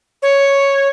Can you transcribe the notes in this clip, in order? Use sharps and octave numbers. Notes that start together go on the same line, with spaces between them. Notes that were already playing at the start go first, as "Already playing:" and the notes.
C#5